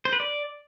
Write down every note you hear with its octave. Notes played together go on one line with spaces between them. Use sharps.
C5
B4
D5